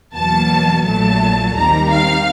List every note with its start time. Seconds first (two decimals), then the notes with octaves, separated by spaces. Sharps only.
0.15 E2 B2 F#3 A#3 A5
0.85 A#1 A#2 F#3 A3 A5
1.55 D#2 D#3 G3 C4 A#5
1.90 F5